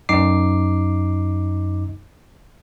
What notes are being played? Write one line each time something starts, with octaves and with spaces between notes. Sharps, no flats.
F#2 D#4 D6 C7